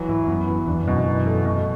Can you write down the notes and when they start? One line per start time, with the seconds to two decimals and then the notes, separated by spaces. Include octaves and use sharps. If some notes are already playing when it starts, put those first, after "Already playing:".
Already playing: E3 F#3
0.09 G#2 E4
0.27 F#2 B3
0.47 E3
0.67 E2 D4
0.87 F#2 B2
1.06 F#2 E3
1.26 A3
1.46 B2